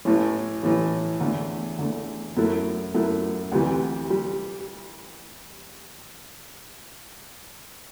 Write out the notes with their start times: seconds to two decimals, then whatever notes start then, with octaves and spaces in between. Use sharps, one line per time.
0.05 A1 A2 E3
0.63 A1 A2 E3
1.21 E2 D3 A3
1.79 E2 D3 A3
2.37 F#2 F#3 A3 E4 A4
2.94 F#2 F#3 A3 E4 A4
3.52 D2 C3 E3 G3
4.10 G3